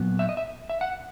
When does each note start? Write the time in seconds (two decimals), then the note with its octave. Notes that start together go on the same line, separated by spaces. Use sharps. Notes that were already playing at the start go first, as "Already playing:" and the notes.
Already playing: A#2 F#3 B3
0.19 E5
0.29 D#5
0.37 E5
0.70 E5
0.81 F#5